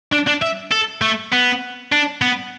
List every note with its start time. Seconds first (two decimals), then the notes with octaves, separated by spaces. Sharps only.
0.12 D4
0.27 D4
0.42 E5
0.71 A4
1.01 A3
1.32 B3
1.92 D4
2.22 B3